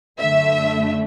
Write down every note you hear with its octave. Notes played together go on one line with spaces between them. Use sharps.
F#2 D3 A3 E5